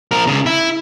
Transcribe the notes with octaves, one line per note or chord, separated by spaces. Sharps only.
F3 A#4
C#2 C#3
E4